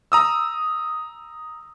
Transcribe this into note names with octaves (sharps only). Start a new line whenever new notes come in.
A#5 D#6 E6